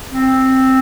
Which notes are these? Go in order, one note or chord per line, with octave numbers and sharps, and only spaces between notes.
C4